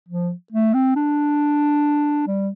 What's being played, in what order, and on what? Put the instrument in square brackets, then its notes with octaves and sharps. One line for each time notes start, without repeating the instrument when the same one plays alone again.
[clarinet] F3
A3
C4
D4
G3